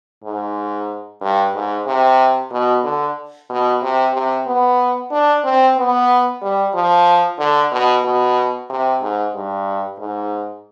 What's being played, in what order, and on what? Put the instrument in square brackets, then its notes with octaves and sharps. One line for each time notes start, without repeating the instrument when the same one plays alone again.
[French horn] G#2
G2
G#2
C3
B2
D3
B2
C3
C3
B3
D4
C4
B3
G3
F3
D3
B2
B2
C3
G#2
G2
G#2